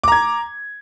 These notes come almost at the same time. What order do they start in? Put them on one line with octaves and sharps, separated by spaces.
D6 A#5 G#6